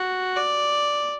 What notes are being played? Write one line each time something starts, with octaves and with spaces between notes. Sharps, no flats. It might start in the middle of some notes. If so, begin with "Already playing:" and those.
Already playing: F#4
D5